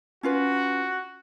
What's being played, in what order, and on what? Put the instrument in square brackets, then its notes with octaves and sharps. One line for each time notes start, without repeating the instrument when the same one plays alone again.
[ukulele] C#4 F4 B4 [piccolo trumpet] F#4